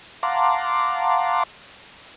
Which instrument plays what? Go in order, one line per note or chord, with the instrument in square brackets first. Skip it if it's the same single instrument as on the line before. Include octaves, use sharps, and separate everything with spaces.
[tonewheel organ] F5 F#5 A5 A#5 C6 D6